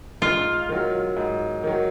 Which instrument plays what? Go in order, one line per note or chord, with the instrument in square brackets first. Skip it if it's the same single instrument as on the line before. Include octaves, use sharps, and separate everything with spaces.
[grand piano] G#2 [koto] F4
[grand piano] D#3 F#3
G#2
D#3 F#3